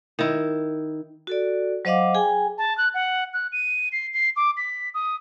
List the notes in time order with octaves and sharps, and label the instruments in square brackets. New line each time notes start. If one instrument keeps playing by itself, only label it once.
[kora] D#3 E4
[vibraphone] F#4 A4 D5
F#3 C5 D#5 F5 F#5 D6
G#4 G5 G#5
[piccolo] A5
F#6
F#5
F#6
D#7
C7
C7
D6
B6
D#6